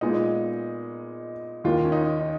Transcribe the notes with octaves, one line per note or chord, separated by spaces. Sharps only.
A#2 G#3 B3 D#4
D#2 D#3 A#3 F4
C#4
D#4
D#4